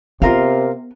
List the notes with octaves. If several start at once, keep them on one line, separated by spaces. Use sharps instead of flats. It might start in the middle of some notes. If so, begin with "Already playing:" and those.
C3 B3 F4 A#4 F5